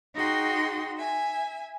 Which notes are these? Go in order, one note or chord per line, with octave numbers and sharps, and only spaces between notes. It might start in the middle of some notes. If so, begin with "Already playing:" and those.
D#4 F#4 G#4 G5 C6
E5 G#5